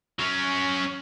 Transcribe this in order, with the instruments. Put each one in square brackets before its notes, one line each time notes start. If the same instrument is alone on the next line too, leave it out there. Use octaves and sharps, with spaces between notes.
[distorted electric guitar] F#3 C#4